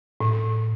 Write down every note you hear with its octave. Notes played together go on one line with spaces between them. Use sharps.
A2